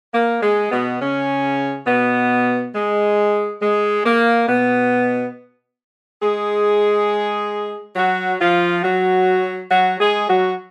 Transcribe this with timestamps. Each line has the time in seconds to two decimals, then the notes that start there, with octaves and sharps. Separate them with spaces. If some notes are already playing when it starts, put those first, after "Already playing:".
0.14 A#3
0.43 G#3
0.71 B2 B3
1.01 C#3 C#4
1.87 B2 B3
2.75 G#3
3.62 G#3
4.06 A#3
4.48 B2 B3
6.22 G#3 G#4
7.96 F#3 F#4
8.40 F3 F4
8.83 F#3 F#4
9.70 F#3 F#4
10.00 G#3 G#4
10.28 F#3 F#4